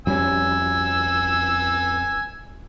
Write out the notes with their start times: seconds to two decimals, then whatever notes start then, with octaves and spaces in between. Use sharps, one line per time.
0.07 F2 G3 C#4 G#5 E6